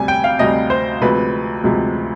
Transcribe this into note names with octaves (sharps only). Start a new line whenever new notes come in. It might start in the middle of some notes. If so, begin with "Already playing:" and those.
Already playing: D2 C3 G3 G#5
G5
F5
D2 C3 G3 D#5
C5
D2 C3 F3 G#3 B4
D2 C3 F3 G#3